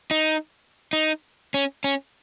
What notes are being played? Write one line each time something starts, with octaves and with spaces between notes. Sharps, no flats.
D#4
D#4
C#4
C#4